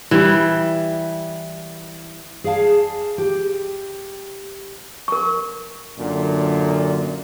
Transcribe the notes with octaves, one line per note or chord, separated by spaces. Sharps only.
E3 G3
G#4 D5 F5 A5
G4
A#4 C#6
F#2 A#2 D3